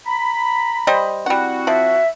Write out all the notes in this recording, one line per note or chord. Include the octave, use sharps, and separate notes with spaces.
A#5 B5
G3 C5 D#5
G3 C4 E4 F#4 F#5
F3 E5